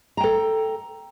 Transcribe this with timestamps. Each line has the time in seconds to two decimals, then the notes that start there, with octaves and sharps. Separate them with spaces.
0.17 A#5
0.20 G5
0.24 A4